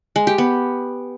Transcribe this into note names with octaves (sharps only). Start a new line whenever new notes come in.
G#3
G4
B3